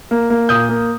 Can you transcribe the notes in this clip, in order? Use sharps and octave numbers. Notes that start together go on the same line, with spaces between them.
A#3
A#3
A#2 D#6 G6
A#3